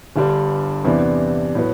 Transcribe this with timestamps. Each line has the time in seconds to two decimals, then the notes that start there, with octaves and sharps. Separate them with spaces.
0.16 G1 G2 D3 G3
0.85 E2 C3 E3 B3 D4
1.55 A2 F#3 B3